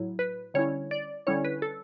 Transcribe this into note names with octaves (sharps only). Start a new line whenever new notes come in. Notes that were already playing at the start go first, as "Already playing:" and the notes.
Already playing: A2 F#3 E4
B4
D3 G3 C#4 E4 C#5
D5
D3 G3 C#4 E4 C#5
B4
A4